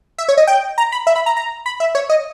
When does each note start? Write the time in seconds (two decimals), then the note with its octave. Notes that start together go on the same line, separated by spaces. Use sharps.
0.18 E5
0.29 C#5
0.37 D#5
0.47 G5
0.78 A#5
0.92 B5
1.07 E5
1.16 B5
1.26 A#5
1.37 A#5
1.66 B5
1.80 E5
1.95 C#5
2.10 D#5